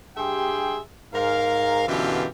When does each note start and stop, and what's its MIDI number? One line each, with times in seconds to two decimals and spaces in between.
0.17 0.79 43
0.17 0.79 67
0.17 0.79 68
0.17 0.79 76
0.17 0.79 79
0.17 0.79 84
1.14 1.83 44
1.14 1.83 70
1.14 1.83 77
1.88 2.26 42
1.88 2.26 47
1.88 2.26 50
1.88 2.26 52
1.88 2.26 65
1.88 2.26 67